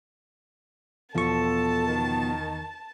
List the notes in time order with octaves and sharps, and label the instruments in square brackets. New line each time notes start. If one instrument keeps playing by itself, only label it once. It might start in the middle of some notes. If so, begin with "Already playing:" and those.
[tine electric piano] E2 C#6 [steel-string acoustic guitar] B2 F3 [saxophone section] A4 [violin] A5
[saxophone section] D#3